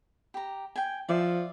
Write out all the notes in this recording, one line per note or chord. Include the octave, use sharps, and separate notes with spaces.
G4 A#5
G5 G#5
F3 D5 E5